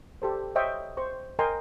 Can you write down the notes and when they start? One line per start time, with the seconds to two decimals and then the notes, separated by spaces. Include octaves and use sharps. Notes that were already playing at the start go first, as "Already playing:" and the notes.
0.22 G4 A4 C5
0.55 C5 C#5 D#5 E5 G5 C#6
0.97 C5 C#6
1.39 A#4 D#5 G5 G#5 A#5 C6